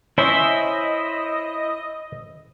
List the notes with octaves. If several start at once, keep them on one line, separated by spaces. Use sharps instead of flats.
C#4 E4 C5 D#5 E5